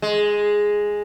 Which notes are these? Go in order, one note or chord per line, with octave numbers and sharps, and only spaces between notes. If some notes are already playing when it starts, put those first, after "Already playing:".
G#3